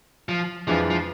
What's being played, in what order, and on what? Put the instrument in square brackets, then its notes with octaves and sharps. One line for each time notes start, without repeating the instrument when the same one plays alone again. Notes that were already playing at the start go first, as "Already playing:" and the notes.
[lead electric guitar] F3
[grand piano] F2 E3 G#3 D4 [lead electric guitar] F3
[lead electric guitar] F3